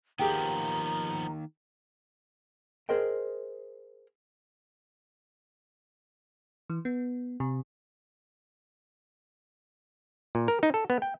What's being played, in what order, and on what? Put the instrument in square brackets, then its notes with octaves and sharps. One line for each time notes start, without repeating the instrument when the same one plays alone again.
[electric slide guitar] D#3 A#3 [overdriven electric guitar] F3 B3 [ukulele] G4 G#4 G5 [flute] A#5
[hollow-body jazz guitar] G#4 A#4 C5 D#5 G5
[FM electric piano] E3
B3
C3
[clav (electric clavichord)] A#2
A#4
D#4
A4
B3
G5